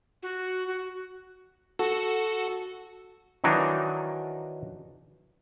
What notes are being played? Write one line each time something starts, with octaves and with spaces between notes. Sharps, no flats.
F#4
F#4
F#4 A4
D#3 E3 F#3 D4 D#4